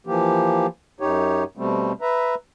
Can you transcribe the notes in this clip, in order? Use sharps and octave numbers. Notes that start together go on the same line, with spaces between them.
E3 F3 A#3 G4
F#2 D#4 G4 C#5
B2 G3 A3 C4
B4 E5 A#5